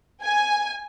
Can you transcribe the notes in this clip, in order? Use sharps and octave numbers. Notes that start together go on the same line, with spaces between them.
G#5